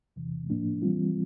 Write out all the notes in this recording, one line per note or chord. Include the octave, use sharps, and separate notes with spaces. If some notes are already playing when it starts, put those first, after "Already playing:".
E2 C3 E3
A2 F3 A#3 D4
E3 G3 C4 F4